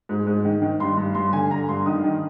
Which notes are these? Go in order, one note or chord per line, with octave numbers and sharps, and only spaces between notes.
G#2
G#2
D#3
D#3
G2 C6
G2
G2 C6
D3 G#5
D3 A#5
G2 C6
D#3 D#6
D#3